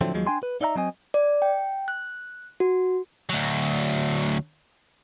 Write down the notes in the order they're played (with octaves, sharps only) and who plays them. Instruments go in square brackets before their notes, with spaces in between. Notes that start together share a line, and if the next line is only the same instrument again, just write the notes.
[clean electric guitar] A2 D3 F3 F#3 A3 C4
D#2 F3 F#3 G#3
D4 G5 G#5 C6
B4
D#4 D5 E5 F#5 A#5
F#3 C4 D#5 G#5
[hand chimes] D5
G5
F#6
F#4
[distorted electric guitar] D2 F#3